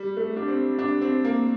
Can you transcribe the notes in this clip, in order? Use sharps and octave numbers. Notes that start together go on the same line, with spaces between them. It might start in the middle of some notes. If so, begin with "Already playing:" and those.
Already playing: G3
A3
D4
C4
D4
C4
A#3